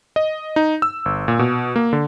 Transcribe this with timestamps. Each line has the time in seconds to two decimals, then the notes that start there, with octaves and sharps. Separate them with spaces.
0.16 D#5
0.56 D#4
0.82 E6
1.05 G1
1.28 A#2
1.39 B2
1.76 A#3
1.93 D3